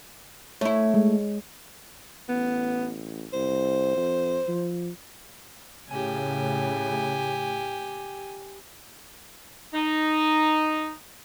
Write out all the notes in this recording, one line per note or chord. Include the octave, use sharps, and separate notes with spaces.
A3 E4 C#5
G#3
A1 B3
C2 C5
F2
F3
A2 C#3 G4 G#5
D#4